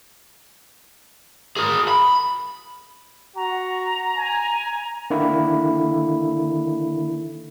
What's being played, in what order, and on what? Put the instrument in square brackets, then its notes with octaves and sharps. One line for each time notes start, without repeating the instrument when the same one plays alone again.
[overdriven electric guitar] G#4 A#4
B5
[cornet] F#4 [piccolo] A#5
[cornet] G#5
[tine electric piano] D3 D#3 A#3 E4